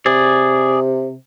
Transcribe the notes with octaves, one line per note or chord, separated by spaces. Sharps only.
C3 G#4 D5